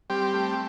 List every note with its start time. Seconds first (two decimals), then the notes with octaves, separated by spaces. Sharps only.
0.10 G3 C4 G4
0.34 A3